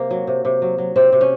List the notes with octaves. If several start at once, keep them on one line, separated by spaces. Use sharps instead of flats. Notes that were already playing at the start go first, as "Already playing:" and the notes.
Already playing: C3 A#3
F#3
C3
C3
F#3
F#3
C3 C4
C3
C#4